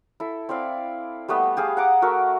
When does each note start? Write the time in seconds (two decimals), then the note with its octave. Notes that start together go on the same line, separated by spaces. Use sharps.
0.20 E4 A4
0.49 C4 E4 D5 F5
1.28 G3 A3 B3 D#5
1.57 G4 G#4 F5
1.77 F#5 A#5 D6
2.02 A3 F#4 A#4 E5